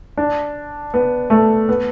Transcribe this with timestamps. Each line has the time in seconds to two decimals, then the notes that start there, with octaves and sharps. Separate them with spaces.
0.17 D4
0.94 B3
1.30 A3
1.69 B3